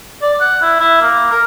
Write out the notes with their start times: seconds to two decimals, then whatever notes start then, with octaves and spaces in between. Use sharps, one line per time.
0.22 D5
0.40 F#5
0.62 E4
0.80 E4
1.02 A#3
1.32 A#4